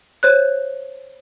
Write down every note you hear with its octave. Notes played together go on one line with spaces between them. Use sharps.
C5 C#5 F#6